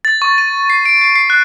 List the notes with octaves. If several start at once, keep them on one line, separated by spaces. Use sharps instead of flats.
A6
C#6
D#7
C7
D7
C7
C7
F#6